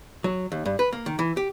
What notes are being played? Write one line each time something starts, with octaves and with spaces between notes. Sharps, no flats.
F#3
D#2
G2
B4
A#3
D#3
E3
G4